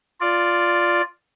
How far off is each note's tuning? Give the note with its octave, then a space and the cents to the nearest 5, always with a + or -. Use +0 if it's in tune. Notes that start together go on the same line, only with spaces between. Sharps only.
F4 +0 D5 +0